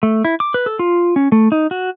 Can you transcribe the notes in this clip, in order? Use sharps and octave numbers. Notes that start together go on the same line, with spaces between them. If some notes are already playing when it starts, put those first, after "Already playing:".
A3
E4
D6
B4
A4
F4
C#4
A3
D#4
F#4